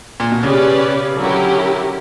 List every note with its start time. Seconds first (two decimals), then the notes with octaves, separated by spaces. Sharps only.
0.20 A#2
0.32 B2
0.43 C#3 C#4 G4 B4 D5
1.17 D3 F#3 C#4 E4 G4 A#4